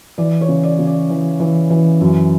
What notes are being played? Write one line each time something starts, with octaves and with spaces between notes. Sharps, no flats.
E3 D5
C#5
C#3
D5
C#3
D5
E3
E3
E3
F#2